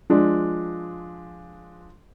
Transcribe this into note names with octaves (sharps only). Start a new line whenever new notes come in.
F3 G#3 D4